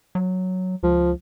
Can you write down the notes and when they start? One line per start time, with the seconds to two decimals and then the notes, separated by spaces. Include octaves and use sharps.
0.15 F#3
0.83 C#2 F3